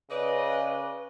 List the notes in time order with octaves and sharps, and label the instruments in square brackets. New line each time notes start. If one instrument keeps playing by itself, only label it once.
[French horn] C#3 [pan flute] B4 [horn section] D5 D#5